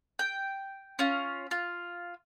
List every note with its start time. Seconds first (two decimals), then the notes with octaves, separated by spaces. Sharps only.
0.19 G5
0.99 C#4 F4
1.51 F4